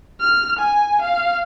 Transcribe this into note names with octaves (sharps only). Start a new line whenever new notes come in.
F6
G#5
F5